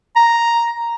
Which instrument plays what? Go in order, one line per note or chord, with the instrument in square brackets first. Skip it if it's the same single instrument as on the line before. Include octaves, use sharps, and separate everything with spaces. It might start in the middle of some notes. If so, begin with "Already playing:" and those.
[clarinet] A#5